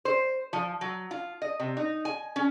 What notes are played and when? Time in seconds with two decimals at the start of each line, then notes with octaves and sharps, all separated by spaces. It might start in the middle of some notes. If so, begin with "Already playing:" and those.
0.05 C5
0.53 F3
0.81 F#3
1.11 F4
1.42 D#5
1.60 C3
1.77 D#4
2.05 G#5
2.36 C#4